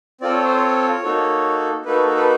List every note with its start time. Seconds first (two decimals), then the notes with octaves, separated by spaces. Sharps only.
0.21 C4 F4 A4 D5
0.33 C#5
0.44 C5
0.55 C#5
1.04 A#3 D#4 F#4 A4
1.85 A#3 D#4 F#4 A4 B4
2.07 A4
2.17 B4